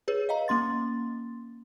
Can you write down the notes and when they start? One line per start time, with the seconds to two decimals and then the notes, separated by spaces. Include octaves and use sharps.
0.08 G#4 B4 C#5
0.29 D#5 F5 A#5
0.48 A#3 C#4 C6 A6